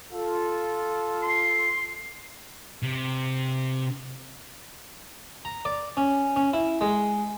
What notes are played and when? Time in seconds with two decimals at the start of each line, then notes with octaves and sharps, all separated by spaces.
0.13 F4 A4
1.23 C6
2.83 C3
5.45 A#5
5.65 D5
5.97 C#4
6.36 C#4
6.53 E4
6.81 G#3